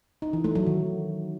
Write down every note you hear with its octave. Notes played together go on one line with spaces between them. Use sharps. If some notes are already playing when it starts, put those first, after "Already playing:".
D#4
E3
A3
F#3
D#3